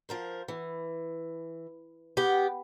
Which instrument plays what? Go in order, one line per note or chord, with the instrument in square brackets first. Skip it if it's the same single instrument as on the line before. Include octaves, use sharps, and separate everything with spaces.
[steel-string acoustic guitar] F3 A#4 C5
E3
[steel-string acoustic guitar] B3 [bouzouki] G4